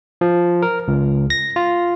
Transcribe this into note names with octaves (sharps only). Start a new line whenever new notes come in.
F3
A#4
C#2
A#6
F4